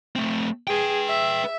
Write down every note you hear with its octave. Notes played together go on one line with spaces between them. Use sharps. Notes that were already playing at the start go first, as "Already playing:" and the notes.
A3 C4
G#4 B4 G5
E5